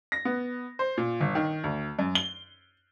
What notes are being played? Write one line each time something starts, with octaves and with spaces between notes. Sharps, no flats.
A#6
B3
C5
A#2
G1
D#3
D2
F#2
G7